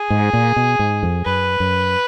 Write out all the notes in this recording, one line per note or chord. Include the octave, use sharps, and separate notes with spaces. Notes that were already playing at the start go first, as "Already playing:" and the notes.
Already playing: G#4
G#2
A#2
B2
G#2
F2
F#2 B4
F#2